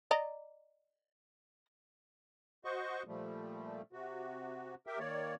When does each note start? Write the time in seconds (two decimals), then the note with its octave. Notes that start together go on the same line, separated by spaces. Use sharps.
0.11 D5 D#5 A#5
2.65 F#4 C5 D#5 C#6
3.07 A#2 F3 G3 A3
3.93 C3 F#4
4.87 G4 A#4 E5 G5
4.99 D#3 A#3 C#5 D5